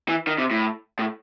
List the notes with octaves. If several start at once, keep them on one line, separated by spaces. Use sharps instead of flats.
E3
D#3
C3
A2
A2